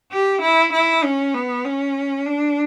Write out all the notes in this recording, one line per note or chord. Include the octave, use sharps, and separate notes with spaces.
G4
E4
E4
C#4
B3
C#4
D4